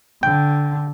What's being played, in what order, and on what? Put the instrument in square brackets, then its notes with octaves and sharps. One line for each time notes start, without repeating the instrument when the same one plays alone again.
[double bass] D3 [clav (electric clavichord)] G5